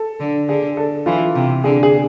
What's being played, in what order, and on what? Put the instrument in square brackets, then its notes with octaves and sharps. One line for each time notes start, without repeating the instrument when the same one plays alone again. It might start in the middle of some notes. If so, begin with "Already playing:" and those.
Already playing: [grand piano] A4
[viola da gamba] D3
[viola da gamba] D3 [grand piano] G#4
[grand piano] A4
[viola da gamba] E3 [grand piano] F4
[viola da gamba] C3
[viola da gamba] D3 [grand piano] G#4
[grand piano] G#4